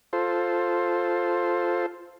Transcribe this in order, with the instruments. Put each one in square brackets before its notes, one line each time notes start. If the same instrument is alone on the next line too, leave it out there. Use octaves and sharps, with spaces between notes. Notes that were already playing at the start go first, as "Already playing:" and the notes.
[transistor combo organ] F4 A4 C5